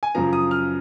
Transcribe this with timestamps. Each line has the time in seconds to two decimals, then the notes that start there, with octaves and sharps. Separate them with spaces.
0.03 G#5
0.15 F#2 C#3 F3 A#5
0.33 D#6
0.51 F6